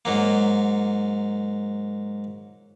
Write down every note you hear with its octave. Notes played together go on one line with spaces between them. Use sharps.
G#2 F#3 A#3